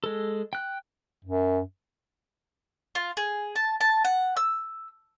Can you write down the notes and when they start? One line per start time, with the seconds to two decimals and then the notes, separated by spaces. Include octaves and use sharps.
0.04 G#3 A4
0.53 G5 F#6
1.25 F#2
2.95 F4
3.17 G#4
3.56 A5
3.81 A5
4.05 F#5
4.37 E6